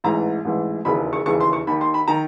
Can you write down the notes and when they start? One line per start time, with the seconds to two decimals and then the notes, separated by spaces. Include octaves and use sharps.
0.04 A1 G#2 E3 A#5
0.45 A1 G#2 E3
0.85 E1 D#2 C#3 E3 B5
1.13 C#6
1.26 E1 D#2 C#3 E3 C#6
1.40 C6
1.53 C#6
1.67 D#2 D#3 B5
1.81 C6
1.94 B5
2.08 D#3 A#5